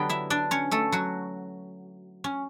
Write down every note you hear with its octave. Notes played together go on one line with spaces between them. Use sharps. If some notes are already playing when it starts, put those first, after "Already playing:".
Already playing: D3 F#3 B3 G4 G5
E4 E5
D4 D5
C#4 C#5
A3 A4
F#3 F#4
C#4